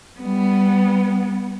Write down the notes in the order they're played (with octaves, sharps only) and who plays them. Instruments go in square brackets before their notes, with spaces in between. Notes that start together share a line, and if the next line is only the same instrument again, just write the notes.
[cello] G3 B3